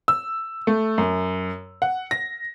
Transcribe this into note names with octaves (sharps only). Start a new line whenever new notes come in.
E6
A3
F#2
F#5
A#6